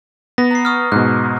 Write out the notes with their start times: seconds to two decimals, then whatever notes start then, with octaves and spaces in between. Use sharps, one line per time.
0.38 B3 A#6
0.51 A#5 C7
0.65 C#6 D#6 F6
0.92 G#2 B2 F#6